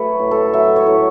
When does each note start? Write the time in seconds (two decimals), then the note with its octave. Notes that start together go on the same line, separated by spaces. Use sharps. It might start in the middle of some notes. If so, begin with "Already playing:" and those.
Already playing: F#3 A3 B4 C#5
0.20 A2
0.31 A4
0.54 F#3 E5
0.76 C#5
0.86 A2